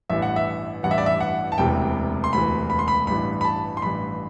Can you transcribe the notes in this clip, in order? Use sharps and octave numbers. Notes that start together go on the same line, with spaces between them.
A1 G2 E3 E5
F#5
E5
A1 G2 E3 F#5
E5
D5
E5
F#5
A5
E1 D2 C3 E3 G5
C6
E1 D2 C3 E3 B5
B5
C6
B5
A1 G2 E3 B5
B5
A5
C6
A1 G2 E3 B5